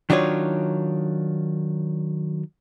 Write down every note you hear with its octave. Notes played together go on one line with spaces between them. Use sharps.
D#3 F#3 D4 D#4 F4 C#5